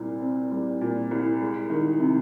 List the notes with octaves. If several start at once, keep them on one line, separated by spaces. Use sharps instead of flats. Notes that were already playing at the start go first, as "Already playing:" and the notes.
Already playing: C2 A#2 G3 C4
C4
G3
A#2
C2
G#3
D#3
C3